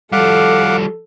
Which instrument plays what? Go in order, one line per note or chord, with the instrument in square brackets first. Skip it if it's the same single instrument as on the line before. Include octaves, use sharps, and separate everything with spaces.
[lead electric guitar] F3 G3 [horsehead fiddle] A4 [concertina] F5 F#5 D6